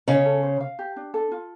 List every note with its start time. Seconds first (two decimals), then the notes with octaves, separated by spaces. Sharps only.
0.08 C#3 C#4 D#5
0.26 A4
0.43 C5
0.61 F5
0.79 G4
0.96 D4
1.14 A4
1.32 F4